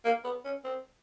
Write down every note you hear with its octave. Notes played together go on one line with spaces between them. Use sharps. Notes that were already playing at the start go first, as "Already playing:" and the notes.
A#3
B3
C#4
C4